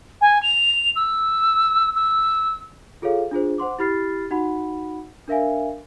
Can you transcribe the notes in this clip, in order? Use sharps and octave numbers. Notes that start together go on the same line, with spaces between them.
G#5
F7
E6
E6
F4 G#4 A4 C#5 F5
D4 F4 G#4 C5
C5 F#5 C6 D6
E4 G4 B5 F6 A6 C7
D#4 F#4 F#5 B5
D4 A#4 E5 F5 G#5